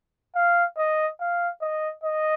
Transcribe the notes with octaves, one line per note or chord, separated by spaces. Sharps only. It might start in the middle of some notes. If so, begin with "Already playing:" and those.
F5
D#5
F5
D#5
D#5